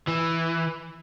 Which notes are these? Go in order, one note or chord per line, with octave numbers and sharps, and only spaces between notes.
E3